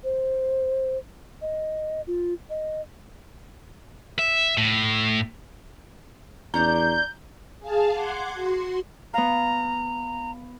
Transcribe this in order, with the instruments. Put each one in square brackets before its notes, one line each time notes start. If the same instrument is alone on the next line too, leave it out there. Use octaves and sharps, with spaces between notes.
[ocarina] C5
D#5
F4
D#5
[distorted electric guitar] E5
A2
[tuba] E2 [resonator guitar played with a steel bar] C#4 D4 D5 [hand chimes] A#5 [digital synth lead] G6
[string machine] G#4 F5 A5
F#5 C6 D6 G#6
F#4 C6
[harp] B3 F5 [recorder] A#5